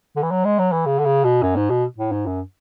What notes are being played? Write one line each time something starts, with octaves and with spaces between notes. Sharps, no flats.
D3
E3
F#3
G#3
F#3
E3
C#3
D3
C#3
B2
F#2
G#2
B2
A2
G#2
F#2